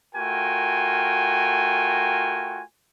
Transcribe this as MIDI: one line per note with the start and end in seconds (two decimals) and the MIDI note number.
0.15 2.62 57
0.15 2.62 65
0.15 2.62 66
0.15 2.62 70
0.15 2.62 79
0.15 2.62 80